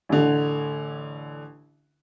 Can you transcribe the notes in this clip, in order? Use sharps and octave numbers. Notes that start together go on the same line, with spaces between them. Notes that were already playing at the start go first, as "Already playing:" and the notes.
A1 D3